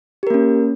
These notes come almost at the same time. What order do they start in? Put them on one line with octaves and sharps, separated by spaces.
G4 A#4 A#3 C#4